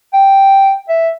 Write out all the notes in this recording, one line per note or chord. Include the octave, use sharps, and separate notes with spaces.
G5
E5